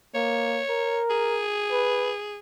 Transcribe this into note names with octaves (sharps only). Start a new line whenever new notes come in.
A#3 C#5
A#4
G#4
B4